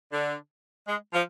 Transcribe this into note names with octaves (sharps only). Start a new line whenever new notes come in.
D3
G#3
F3